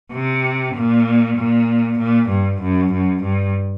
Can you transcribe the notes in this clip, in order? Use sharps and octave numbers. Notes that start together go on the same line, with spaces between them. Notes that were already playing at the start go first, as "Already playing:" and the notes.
C3
A#2
A#2
A#2
G2
F#2
F#2
G2